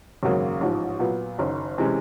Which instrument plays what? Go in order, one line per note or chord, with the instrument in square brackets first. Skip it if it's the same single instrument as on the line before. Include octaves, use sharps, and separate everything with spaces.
[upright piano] G#1 F#2 C#3 F#3 A#3
A1 G#2 F3
A#2 F#3 B3
F#1 F#2 D#3
C3 E3 G#3 C#4